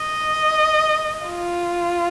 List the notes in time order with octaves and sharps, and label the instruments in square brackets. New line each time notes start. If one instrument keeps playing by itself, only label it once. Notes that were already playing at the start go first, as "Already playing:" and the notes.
Already playing: [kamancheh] D#5
F4